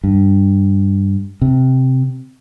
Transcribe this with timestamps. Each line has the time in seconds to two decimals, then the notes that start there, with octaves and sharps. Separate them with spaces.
0.04 G2
1.42 C3